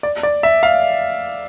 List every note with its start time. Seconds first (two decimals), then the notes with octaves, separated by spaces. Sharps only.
0.03 D5
0.23 D5
0.43 E5
0.63 F5